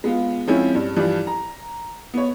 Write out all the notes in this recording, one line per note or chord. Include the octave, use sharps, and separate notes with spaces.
G#3 B3 F4
F3 G#3 C4 C#4 E4
G2
G2 E3 F3 G3
A#5
B3 C#5